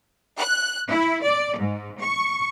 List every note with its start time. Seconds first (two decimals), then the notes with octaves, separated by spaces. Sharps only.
0.37 F#6
0.89 E4
1.23 D5
1.59 G#2
2.01 C#6